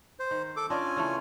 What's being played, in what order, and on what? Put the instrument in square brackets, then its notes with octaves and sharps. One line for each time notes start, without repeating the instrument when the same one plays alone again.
[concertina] C5
[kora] D#3
[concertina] A4 D6
[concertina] C#4 F4 G#5 [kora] D4 D#5
[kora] C#3 E3 A3